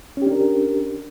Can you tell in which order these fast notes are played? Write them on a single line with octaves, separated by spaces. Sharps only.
C#4 G4 D4 A#4